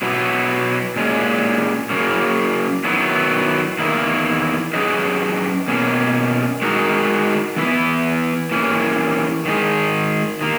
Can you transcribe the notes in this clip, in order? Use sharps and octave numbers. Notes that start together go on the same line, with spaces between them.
B2 F#3 B3 E4
A#2 G#3 C#4
C#3 F#3 A#3
D#3 F#3 B3 E4
E2 D#3 A#3 E4
F#3 C#4 G#4 B4 D#5
B2 A#3 C#4
G#3 D#4 F#4 A#4
E3 B3 E4 B4
E3 A#3 C#4
D#3 G#3 D#4 G#4
D#3 A#3